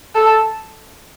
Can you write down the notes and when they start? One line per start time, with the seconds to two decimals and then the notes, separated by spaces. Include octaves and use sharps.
0.15 A4